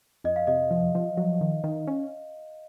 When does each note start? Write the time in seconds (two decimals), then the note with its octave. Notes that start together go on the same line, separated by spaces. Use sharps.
0.24 F2 D#5
0.36 F5
0.47 C3 D#5
0.71 F3
0.95 F3
1.17 F#3
1.41 D#3
1.64 D#3
1.87 C#4